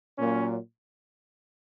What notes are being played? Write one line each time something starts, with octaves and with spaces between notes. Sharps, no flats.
A#2 F#3 A#3 C#4